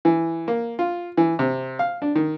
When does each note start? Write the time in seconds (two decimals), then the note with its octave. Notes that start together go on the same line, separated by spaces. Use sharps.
0.05 E3
0.48 A#3
0.79 F4
1.17 E3
1.39 C3
1.79 F5
2.02 D4
2.15 D#3